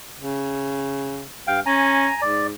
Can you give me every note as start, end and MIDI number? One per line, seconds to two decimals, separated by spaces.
0.20 1.25 49
1.47 1.60 43
1.47 1.60 77
1.47 1.60 79
1.66 2.08 61
1.66 2.21 80
1.66 2.21 82
2.22 2.53 44
2.22 2.47 74